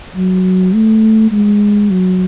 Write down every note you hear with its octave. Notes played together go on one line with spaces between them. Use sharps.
F#3
A3
G#3
F#3